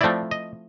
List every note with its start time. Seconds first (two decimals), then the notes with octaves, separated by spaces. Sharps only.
0.01 F3 A3 C4 E4 D5
0.31 D#5